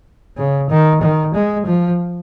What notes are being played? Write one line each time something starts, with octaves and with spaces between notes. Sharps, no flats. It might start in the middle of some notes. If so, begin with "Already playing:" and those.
C#3
D#3
D#3
G#3
F3